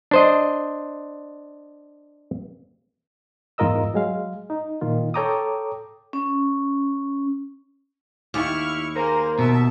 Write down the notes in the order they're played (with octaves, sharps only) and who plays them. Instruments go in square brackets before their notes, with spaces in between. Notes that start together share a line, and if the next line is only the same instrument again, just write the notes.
[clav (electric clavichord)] D4 C5 D#5
[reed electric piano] E2 G#2 F4 A#4 D#5 E6
F#3 G#3 F5
D#4
A#2 D#3 F4
A4 C#5 G5 A#5 D6 D#6
[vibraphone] C#4
[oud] D#2 [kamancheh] E4 C#6 [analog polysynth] F6
[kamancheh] A#3 G#4 [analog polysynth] A#4 C5 A#5
[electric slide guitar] B2 [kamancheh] E5 A5